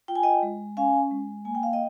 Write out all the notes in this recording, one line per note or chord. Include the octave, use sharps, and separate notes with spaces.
F4 G5
G#5
D#5 G5
G#3
C#4 F5 G#5
G#3
A#3 G#5
G5
F5
D#5 G5